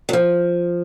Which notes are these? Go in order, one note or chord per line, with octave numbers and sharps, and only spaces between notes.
F#3
F3